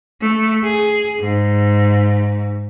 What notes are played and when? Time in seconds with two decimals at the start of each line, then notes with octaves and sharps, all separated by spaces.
0.21 A3
0.65 G#4
1.19 G#2